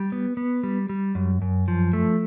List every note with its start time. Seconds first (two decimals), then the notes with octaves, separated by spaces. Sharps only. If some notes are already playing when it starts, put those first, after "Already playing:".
Already playing: G3
0.12 B3
0.37 B3
0.63 G3
0.89 G3
1.15 F#2
1.42 F#2
1.68 F3
1.93 A3